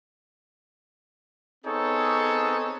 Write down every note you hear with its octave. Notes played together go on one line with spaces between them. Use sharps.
B3 C4 D#4 G#4 A4 C#5